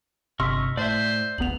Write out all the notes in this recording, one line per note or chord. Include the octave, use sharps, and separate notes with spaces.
G1 C3 D#5 C6 C#6 E6 F6 B6
A2 C5 D5 E5
D1 G#1 B3 F7 F#7